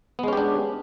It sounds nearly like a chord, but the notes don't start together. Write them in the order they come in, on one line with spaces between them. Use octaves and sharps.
B3 G#3 C#4 G4 D4